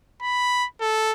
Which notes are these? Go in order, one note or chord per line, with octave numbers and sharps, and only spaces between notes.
B5
A4